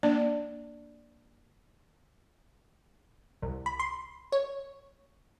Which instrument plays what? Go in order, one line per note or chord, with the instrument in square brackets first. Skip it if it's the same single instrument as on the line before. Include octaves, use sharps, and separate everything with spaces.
[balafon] A#3 D4 D5
[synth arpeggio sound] C2
B5
C6
C#5